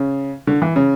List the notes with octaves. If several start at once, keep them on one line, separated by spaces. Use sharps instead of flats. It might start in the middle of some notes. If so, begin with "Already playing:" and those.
Already playing: C#3
D3
E3
C#3